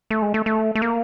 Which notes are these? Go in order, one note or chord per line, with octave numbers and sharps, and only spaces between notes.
A3
G#3
A3
A3
A3
A#3